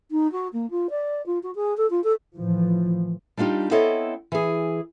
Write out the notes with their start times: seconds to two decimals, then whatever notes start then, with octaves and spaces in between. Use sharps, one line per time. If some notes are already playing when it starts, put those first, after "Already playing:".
0.11 D#4
0.32 F#4
0.53 A#3
0.70 F4
0.90 D5
1.26 F4
1.43 F#4
1.55 G#4
1.77 A4
1.90 F4
2.04 A4
2.36 A2 E3 F3
3.37 G3 D4 D#4 F4 G4
3.71 B3 C4 E4 A4 C#5 D#5
4.32 E3 G#4